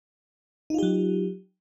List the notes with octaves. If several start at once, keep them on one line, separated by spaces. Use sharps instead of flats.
F#3 D#4 F4 G4